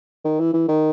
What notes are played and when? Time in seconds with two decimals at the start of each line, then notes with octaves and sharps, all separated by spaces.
0.25 D#3
0.40 E3
0.53 E3
0.68 D#3